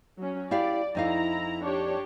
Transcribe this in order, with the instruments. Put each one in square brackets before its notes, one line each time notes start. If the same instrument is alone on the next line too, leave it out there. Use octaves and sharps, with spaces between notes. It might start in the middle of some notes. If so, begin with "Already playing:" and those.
[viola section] F#3 C#4
[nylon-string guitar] E4 G4 F5 [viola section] D5
[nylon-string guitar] F2 D#4 F5 [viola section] E4 A#5
[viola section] D4 G4 C#5